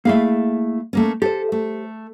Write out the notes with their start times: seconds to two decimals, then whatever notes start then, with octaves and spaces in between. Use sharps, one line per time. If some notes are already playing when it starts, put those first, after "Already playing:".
0.05 A3 A#3 E4 G#4 E5 F5
0.93 A3 A#3 C#4
1.22 G4 A4 C5
1.52 A3